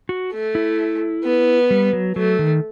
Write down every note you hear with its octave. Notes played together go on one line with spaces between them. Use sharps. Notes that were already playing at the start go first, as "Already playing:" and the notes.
F#4
A3
E4
B3
G3
F#3
F#3 A3
D#3